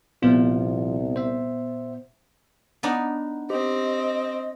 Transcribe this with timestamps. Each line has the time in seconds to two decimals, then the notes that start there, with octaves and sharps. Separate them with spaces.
0.23 C2 A#2 F3 B3 F4
1.16 C5 E5
2.83 B3 D4 D#4
3.50 C4 G4 D#5